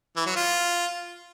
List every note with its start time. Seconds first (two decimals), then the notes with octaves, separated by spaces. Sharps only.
0.16 E3
0.26 F#3
0.36 F4